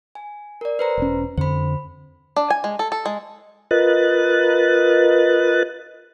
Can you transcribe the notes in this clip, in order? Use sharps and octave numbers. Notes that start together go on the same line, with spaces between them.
G#5
A#4 D5
B4 C5 A#5
E1 C#4
F2 D3 C5 B5
D4
G#5
G#3
A4
A4
G#3
F4 A#4 B4 D#5 F#6 A6